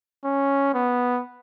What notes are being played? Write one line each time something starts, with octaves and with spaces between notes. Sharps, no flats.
C#4
B3